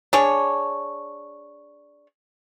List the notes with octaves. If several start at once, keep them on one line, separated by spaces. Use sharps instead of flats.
D4 G#4 C#5